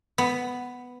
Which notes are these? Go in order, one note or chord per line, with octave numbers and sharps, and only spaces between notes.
B3